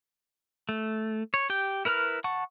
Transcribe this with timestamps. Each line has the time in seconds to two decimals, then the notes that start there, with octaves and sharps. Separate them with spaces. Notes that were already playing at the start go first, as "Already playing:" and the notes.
0.69 A3
1.34 C#5
1.50 G4 G5
1.85 E4 A#4 B4 A#5 F6
2.24 F#5 A5 C#6